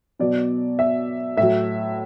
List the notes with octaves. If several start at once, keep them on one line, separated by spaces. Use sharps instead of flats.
B2 F#3 D5
E5
A2 F#3 E5